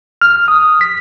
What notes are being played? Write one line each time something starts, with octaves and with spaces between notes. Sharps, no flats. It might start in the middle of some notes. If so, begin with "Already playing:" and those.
F6
D#6
B6